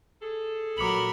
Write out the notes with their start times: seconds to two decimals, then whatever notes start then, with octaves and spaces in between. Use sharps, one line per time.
0.22 G#4 A4
0.78 A#1 F#3 A#4 B5 D6 C#7 F#7